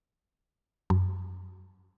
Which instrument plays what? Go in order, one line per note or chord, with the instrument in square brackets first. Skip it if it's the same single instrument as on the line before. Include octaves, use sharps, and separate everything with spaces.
[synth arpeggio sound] F#2